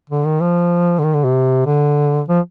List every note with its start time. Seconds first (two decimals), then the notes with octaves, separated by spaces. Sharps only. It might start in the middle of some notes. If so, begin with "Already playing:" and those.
0.10 D3
0.25 D#3
0.41 F3
0.99 D3
1.04 D#3
1.14 D3
1.24 C3
1.66 D3
2.28 F3